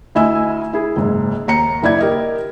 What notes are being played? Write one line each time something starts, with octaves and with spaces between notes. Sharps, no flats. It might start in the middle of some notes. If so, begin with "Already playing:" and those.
D2 E4 D#5 G#5 E6
E4 G#4
F#1 G#2
D#2 A#5 C#7
F#1 E4 D5 G#6
G4 A#4 D#5